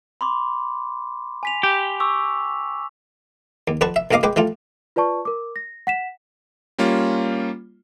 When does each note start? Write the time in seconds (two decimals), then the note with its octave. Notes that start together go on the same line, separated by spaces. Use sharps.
0.21 B5 C6 D6
1.43 G#5 B6 F7
1.63 G4
2.00 C#6 D6 E6
3.68 D#2
3.81 F2 F#4 B4 A5 C#6
3.96 E5
4.11 B1 F#2 A#3 D#5 F5 D6
4.23 G#3 B4 G5 D6
4.36 E3 G3 A3 F4
4.96 F4 B4 D5 A5 C#6
5.25 A#4 D6
5.56 A#6
5.87 F#5 B6 E7
6.79 G3 A#3 C#4 F4